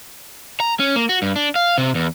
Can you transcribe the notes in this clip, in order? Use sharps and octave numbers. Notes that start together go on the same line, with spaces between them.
A#5
C#4
A#3
F#4
G2
D4
F5
C3
E2